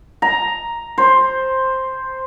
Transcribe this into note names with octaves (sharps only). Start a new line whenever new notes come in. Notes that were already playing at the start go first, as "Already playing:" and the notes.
A#5
C5